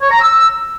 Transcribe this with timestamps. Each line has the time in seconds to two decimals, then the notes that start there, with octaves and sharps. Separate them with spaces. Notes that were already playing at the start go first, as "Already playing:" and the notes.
0.01 C#5
0.11 A#5
0.21 E6